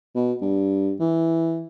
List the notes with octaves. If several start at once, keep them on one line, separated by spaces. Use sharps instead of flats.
B2
G2
E3